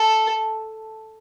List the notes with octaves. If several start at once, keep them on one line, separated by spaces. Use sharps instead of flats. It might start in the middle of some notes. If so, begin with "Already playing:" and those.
Already playing: A4